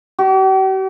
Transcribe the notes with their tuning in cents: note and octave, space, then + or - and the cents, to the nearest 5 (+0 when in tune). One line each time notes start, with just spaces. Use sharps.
G4 -45